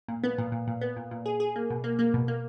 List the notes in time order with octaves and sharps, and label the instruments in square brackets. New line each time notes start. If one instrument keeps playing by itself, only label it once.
[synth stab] A#2
B3
A#2
A#2
A#2
B3
A#2
A#2
G#4
G#4
A#3
B2
A#3
A#3
B2
A#3